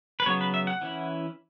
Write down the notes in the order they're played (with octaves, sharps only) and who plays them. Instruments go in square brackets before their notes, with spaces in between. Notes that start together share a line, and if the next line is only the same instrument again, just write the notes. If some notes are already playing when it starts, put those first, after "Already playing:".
[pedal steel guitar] B4
C#3 F#3 B3 C#5
B4
E5
F#5
E3 C#4 E4